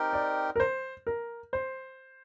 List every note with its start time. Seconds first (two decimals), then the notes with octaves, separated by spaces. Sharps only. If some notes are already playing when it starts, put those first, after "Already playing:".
Already playing: C4 D#4 G4 A#4
0.13 D5
0.56 A#4
0.60 C5
1.07 A#4
1.53 C5